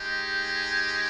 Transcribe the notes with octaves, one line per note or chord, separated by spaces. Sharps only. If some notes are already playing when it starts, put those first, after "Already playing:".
Already playing: G#3 D#4 G4
G#5